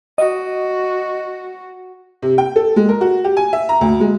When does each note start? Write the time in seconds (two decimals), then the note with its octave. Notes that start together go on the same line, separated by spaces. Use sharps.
0.18 F#4 D#5
2.22 C3
2.38 G5
2.56 A4
2.76 G#3
2.89 A#4
3.01 F#4
3.24 G4
3.37 G#5
3.53 E5
3.69 A#5
3.81 D2
4.00 G#3